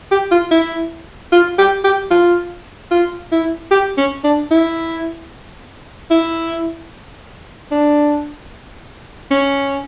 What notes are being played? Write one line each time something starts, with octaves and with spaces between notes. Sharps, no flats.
G4
F4
E4
F4
G4
G4
F4
F4
E4
G4
C#4
D4
E4
E4
D4
C#4